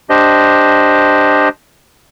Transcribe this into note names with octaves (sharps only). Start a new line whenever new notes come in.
D4 G4 C5 D#5